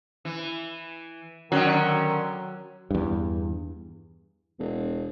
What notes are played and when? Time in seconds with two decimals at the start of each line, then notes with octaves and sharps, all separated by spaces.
0.25 E3
1.52 D3 D#3 F#3 C#4
2.91 E2 G2
4.60 E1